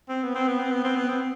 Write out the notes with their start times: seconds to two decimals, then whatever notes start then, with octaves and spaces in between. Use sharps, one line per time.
0.09 C4
0.24 B3
0.35 C4
0.48 B3
0.59 C4
0.72 B3
0.84 C4
0.96 B3
1.09 C4